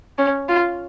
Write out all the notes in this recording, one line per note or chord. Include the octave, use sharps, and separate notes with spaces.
C#4
F4